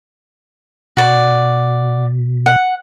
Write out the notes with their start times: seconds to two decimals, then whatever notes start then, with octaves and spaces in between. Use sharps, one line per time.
0.97 B2 F#4 D5
2.46 F#5